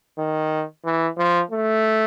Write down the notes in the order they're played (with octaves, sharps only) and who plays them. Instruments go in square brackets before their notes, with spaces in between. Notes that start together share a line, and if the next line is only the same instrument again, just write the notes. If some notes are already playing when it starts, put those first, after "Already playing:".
[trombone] D#3
E3
F3
A3